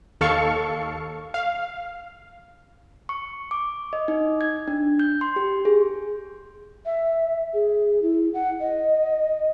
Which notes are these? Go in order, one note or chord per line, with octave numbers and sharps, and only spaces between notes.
D#2 A4 F5 C#6 C#7
F5
C#6
D6
D#5
D#4
G#6
D4
G6
C6
G4
G#4
E5
G#4
E4
F#5
D#5